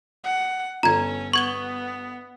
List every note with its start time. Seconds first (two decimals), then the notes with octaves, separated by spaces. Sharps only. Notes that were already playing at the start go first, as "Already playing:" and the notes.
0.24 F#5
0.83 G1 C#4 A4 A#5 G#6
1.34 B3 C#6 G#6 G7